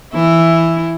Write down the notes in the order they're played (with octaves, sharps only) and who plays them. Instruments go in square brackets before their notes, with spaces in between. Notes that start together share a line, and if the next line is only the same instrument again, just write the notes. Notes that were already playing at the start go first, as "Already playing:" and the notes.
[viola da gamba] E3 E4